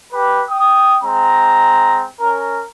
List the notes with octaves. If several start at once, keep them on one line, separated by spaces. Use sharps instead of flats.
G4 B4
G5 D#6
G#3 C4 A#5
C#4 A#4